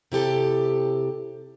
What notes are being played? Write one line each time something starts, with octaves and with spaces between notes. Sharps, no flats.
C3 E4 G4 A4